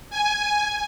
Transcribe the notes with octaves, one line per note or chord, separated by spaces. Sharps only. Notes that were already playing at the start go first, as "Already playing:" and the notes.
G#5